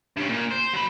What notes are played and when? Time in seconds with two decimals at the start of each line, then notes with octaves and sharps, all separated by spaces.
0.17 G2 C#3
0.29 A#2
0.52 C5
0.74 F#3 B5